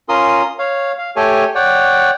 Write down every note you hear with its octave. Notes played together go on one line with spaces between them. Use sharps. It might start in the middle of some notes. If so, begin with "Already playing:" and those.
C#4 F4 A#4 C6 D#6
C#5 F5
F5
A3 G4 A4 C#5 G#5
C#5 D5 F#5 G5